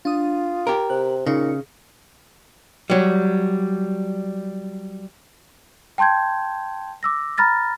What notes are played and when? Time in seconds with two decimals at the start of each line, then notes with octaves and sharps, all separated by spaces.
0.05 D4 F4 D#6
0.67 G4 A#4
0.90 C3 F#6
1.26 A#2 C#3 D#4 C#7
2.90 F#3 G3
5.98 G5 A5 C6 G6 G#6
7.03 D6 E6 A#6
7.38 A#5 B5 F6 A6 A#6